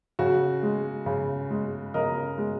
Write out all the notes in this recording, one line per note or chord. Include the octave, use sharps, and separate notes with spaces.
C#3 F#4
G#3
C#3
G#3
C#3 A#4 D#5
G#3